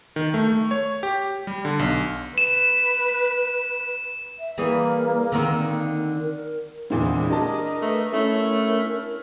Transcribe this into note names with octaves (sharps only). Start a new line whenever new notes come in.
D#3
A3
A3
C#5
G4
G3
D3
B1
B4 E7
E5
E3 G3 A#3 G#4
D3 D#3 C4
A#4
E2 A#2 D3 G#3 C4 E4 G#4
D4 G4 A#4 D#5 A5
A3 B4
A3 C#4 E4 A#4